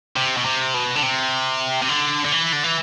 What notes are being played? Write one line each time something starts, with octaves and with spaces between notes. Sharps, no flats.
C3
B2
C3
B2
D3
C3
C3
D3
D3
E3
D3
E3